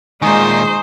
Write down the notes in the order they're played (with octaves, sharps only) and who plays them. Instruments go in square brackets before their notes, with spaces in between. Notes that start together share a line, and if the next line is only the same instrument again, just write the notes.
[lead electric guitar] A#2 D#3 [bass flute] G#3 [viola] D#4 C5 [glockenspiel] G#5 C#6 D#6